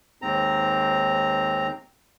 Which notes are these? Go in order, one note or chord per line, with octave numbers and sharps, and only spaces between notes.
D#2 G#2 C4 A#5